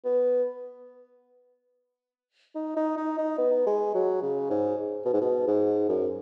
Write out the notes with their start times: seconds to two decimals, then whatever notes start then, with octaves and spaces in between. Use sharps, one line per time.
0.05 B3
2.55 D#4
2.76 D#4
2.97 D#4
3.18 D#4
3.38 B3
3.66 G#3
3.94 F#3
4.22 C#3
4.50 G#2
5.05 B2
5.13 G#2
5.21 B2
5.48 G#2
5.89 F#2